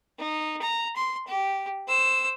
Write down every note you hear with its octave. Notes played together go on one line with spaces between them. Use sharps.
D#4
A#5
C6
G4
C5 E6